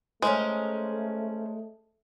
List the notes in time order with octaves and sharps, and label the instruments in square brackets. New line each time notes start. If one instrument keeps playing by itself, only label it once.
[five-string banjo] G#3 [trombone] A3 [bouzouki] C#4 A#4 C5